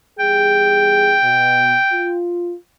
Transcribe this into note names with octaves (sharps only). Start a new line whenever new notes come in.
E2 G3 G#4 G5
B2
F4